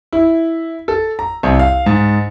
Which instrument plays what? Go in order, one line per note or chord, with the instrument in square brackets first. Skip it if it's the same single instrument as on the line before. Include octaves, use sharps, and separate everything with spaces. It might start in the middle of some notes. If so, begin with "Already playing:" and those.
[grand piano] E4
A4
A#5
C2
F5
G#2